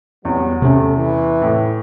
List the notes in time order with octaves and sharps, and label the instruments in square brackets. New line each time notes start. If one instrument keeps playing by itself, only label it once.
[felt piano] E2 [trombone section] F#3 G3 B3
[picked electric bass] C3 C#4 [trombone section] A3
[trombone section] E3
[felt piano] A2